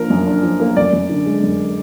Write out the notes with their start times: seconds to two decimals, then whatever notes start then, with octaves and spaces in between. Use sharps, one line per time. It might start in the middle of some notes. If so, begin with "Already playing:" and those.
Already playing: F3 A#3 D4 A#4
0.10 F#2
0.27 D4
0.43 F3
0.60 A#3
0.76 F#2 D5
0.93 F#2
1.09 D3
1.26 G#3
1.43 F#2